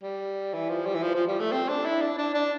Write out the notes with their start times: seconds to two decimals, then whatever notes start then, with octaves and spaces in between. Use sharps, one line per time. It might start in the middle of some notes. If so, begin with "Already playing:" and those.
0.03 G3
0.53 E3
0.69 F3
0.86 G3
0.95 E3
1.02 F3
1.15 F3
1.27 G3
1.40 A3
1.52 C4
1.68 D4
1.85 E4
2.01 D4
2.18 D4
2.34 D4